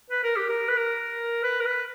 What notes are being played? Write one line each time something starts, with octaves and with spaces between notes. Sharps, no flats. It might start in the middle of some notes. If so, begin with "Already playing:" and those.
B4
A#4
G4
A#4
B4
A#4
B4
A#4
B4